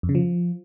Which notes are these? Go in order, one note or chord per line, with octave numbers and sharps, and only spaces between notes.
F2
C#3
F3